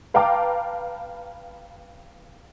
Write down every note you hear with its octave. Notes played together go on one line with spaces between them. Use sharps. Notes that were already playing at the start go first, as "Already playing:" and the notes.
B4 F5 G5 A5 A#5 D6